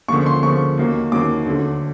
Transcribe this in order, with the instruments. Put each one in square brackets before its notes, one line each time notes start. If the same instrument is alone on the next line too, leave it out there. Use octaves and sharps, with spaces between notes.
[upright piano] D2 C#3 F3 A#3 C#6
C6
D2 C#3 F3 A#3 C#6
D#2 D#3 F#3 A#3
D#2 D#3 F#3 A#3 D6
D2 D3 F#3 A3